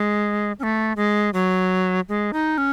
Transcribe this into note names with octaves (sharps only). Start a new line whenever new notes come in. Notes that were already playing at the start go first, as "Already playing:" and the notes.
Already playing: G#3
C#4
A3
G#3
F#3
G#3
D#4
C#4